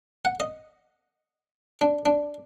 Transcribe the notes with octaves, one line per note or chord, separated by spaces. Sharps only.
F#5
D#5
D4
D4